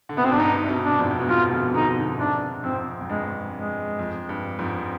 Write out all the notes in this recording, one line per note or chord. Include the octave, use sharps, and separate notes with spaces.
D3
C3 B3
B2 C4
G#2 D4
G2 D#4
C3
G2 B2
D4
F2 G#2
B2
F2 G#2 F4
B2 D3
B2 D3 D#4
B2 D3
G#2 C3 D4
F2 G#2 C4
F2
G2 G#3
G#3
F2
G2
F2 G#2